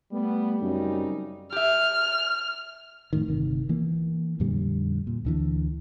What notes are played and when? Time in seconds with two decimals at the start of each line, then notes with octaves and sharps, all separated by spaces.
0.13 G3 A3 B3
0.62 F#2 C#3 C4 D#4
1.52 G4 E5 F6
3.13 F2 A2 D#3
3.28 G1 C3 D#3
3.69 E3 A#3
4.40 F2 A#2 D3 G3
5.07 A#2
5.25 D2 D3 E3